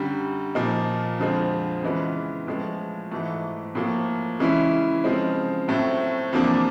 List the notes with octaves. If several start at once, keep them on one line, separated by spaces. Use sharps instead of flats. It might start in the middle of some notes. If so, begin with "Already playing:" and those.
Already playing: F#2 D3 G3
A#2 F3 A#3 D#4
F2 D3 F3 G#3 C4
C#3 E3 G#3 B3
A2 F3 G#3
G#2 E3 A3
A2 F3 A#3
C#3 E3 G#3 C#4 E4
C#3 F3 G#3 C4
A2 F#3 A3 C4
E2 C3 F3 A#3 D4